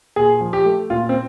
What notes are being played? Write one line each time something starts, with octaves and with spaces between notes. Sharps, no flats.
A#2 G#4
F3
G4
A3
A#2 F4
C4